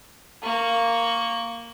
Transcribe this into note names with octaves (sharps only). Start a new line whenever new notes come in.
A#3 C#6